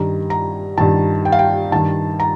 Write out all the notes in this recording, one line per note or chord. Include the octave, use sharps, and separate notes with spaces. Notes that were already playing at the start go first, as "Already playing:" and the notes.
Already playing: G2 D#3 A#5
A#5
G2 D#3 A5
G5
F5
G5
G2 D#3 A5
A#5